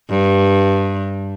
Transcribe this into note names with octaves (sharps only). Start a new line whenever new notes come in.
G2